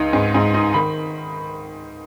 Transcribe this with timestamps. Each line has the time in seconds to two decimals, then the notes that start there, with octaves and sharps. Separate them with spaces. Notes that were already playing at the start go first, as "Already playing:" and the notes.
Already playing: C#2 D#4
0.13 G#2
0.34 G#2
0.54 D#4
0.74 D#3 B5